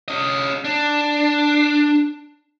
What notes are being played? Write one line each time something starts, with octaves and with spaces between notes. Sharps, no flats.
C#4 D#5
D4